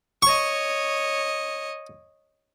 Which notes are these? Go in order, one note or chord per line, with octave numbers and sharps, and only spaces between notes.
C#5 D#5 C#6